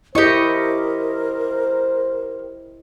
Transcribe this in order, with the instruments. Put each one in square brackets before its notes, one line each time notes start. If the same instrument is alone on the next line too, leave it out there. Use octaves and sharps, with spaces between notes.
[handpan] E4 D#5 [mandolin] G4 C#6 [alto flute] A#4 [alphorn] C5